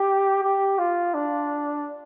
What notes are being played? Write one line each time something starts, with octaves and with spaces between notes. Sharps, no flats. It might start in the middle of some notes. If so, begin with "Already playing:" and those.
Already playing: G4
G4
F4
D4